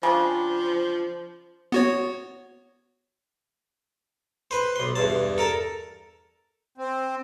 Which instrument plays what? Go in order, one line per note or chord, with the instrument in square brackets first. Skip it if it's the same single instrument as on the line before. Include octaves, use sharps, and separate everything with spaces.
[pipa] C#3 G3 D4 [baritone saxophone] F3
[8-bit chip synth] B3 F#4 C#5
[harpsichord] B4 C5
B1 C6
E2 G2 A5
A4 A#4 A5
[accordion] C4